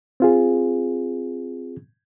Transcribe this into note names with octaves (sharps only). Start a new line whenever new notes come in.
C4 F4 G#4